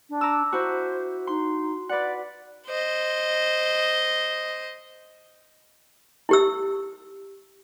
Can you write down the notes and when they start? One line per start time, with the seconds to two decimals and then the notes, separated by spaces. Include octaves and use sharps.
0.09 D4
0.21 A#5 D6 E6
0.53 E4 F#4 C5
1.27 D#4 C6
1.89 B4 D5 F#5
2.67 C5 D#5
6.29 E4 G4 E6